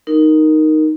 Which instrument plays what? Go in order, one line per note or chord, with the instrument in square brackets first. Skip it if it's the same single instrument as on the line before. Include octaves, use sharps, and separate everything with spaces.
[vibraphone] D#4 A#4